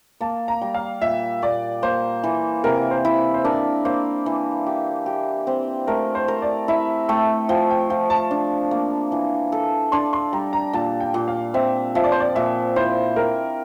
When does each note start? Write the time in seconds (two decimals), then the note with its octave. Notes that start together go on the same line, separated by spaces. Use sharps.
0.21 A#3 A5
0.48 A#5
0.61 G3
0.74 F5
1.01 A#2 E5
1.42 A#2 D5
1.83 A#3 C5
2.23 E3
2.64 C3 A#4
2.91 C5
3.05 E4
3.34 C5
3.44 D4 A#4
3.85 A#3 C5
4.26 E3
4.66 G4
5.06 G4
5.47 C4
5.87 A3 A#4
6.15 C5
6.28 A#4
6.42 D5
6.68 E4 E5
7.09 A3 G5
7.49 F3 G5
7.70 G5
7.90 F3 G5
8.10 A5
8.31 D4
8.71 A#3
9.12 E3
9.52 A4
9.92 D4 C6
10.13 C6
10.32 G3 A#5
10.53 A#5
10.73 A#2 A5
11.00 G5
11.14 A#2
11.28 F5
11.54 C4 E5
11.95 F3 E5
12.04 D5
12.12 C5
12.20 D5
12.35 A#2 E5
12.76 E4 C5
13.16 C4 A#4